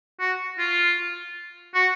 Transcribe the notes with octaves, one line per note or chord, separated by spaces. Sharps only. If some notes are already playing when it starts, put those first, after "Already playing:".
F#4
F4
F#4